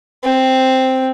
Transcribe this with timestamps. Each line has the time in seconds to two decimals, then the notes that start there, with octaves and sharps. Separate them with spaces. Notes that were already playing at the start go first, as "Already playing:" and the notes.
0.24 C4